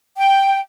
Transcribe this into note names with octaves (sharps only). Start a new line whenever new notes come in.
G5